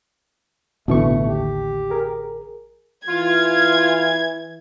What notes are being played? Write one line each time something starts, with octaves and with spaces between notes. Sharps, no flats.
A1 B2 D3 E3 A3 C#6
D#2 G4
G#4 A#4
E3 F4 G#6